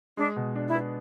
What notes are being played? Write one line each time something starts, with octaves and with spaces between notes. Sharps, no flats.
G#3 D4
B2
D4
E4
B3